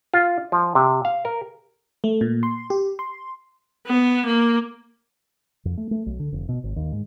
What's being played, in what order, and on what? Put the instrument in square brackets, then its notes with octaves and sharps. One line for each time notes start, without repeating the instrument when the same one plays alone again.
[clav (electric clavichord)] F4
F3
C3
F5
A#4
[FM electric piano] A3
A#2
C6
G4
C6
[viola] B3
A#3
[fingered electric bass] F2
A3
A3
B1
D3
F1
B2
G#1
D#2
G#2